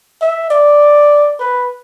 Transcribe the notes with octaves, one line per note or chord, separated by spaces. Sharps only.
E5
D5
B4